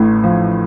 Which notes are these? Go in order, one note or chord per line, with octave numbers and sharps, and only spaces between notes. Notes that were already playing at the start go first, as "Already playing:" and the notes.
Already playing: A1 A2
F3